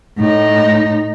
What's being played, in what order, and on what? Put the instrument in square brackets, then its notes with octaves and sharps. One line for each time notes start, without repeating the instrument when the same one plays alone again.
[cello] A2 D#4